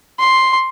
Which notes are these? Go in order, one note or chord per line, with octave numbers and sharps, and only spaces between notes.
C6